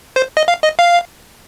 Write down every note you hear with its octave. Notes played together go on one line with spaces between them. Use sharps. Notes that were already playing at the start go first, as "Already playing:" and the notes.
C5
D#5
F5
D#5
F5